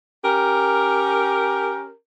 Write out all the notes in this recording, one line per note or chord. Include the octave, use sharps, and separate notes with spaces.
C#4 G4 A#4